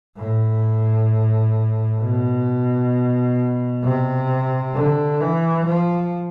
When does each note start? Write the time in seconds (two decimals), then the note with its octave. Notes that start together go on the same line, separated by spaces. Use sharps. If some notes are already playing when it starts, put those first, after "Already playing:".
0.17 A2
2.00 B2
3.83 C3
4.74 D3
5.20 E3
5.66 F3